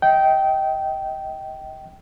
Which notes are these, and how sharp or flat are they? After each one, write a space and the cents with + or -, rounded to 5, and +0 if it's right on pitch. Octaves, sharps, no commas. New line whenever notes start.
D#5 +30 G5 -15